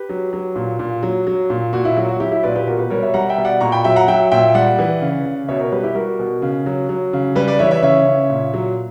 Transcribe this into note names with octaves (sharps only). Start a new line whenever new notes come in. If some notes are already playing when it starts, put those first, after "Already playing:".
Already playing: G4 B4
F#3
F#3
A#2
A#2
F#3
F#3
A#2
A#2 F#4
E4
F#3 F#4
F#4
F#3 E4 G4
E4 G4
A#2 B4 D5
G4 B4
B2 F#4 A#4
G4 B4
G3 A#4 C#5
C#5 E5
G3 F#5 A#5
E5 G5
B2
D5 F#5
A#2 A#5 C#6
G5 B5
F#3 E5 G5
F#5 A#5
F#3 E5 G5
A#2 E5 G5
G3 D5 F#5
E3
C#3
C#3
B2 C#5 E5
A#4 C#5
G3 G4 B4
E4 G4
G3 F#4 A#4
B2
C#3
F#3
F#3
C#3
G3 G4 B4
B4 D5
E3 C#5 E5
C#5 E5
C#3 C#5 E5
C#3
A#2
F#3